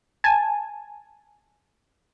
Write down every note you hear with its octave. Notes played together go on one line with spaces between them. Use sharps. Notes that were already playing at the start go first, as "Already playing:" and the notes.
G#5 A5